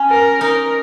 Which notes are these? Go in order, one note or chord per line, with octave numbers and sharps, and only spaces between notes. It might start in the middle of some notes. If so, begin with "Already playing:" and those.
Already playing: C#4
A#4
D#4 A#4